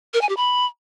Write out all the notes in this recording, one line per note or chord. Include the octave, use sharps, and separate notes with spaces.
A#4
G#5
G4
B5